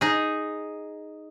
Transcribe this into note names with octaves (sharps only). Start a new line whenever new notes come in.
D#4 G#4